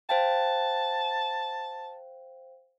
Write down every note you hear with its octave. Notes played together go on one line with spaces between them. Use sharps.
C5 F5 G5 A5